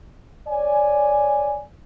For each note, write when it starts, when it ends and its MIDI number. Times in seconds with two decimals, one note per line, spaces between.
0.48 1.62 73
0.48 1.62 74
0.48 1.62 80